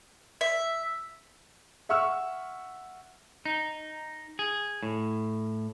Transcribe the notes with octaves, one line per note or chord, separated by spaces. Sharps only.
E5
E5 F#5 C#6 E6 F6
D#4
G#4
A2